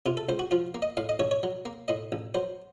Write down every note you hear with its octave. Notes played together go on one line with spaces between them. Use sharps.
C3 F4
A4
C#2 C5
F#4
F3 F4
A#3
D#5
A2 F5
D#5
A1 C#5
C#5
F#3
A#3
A2 D#5
A1
F#3 C5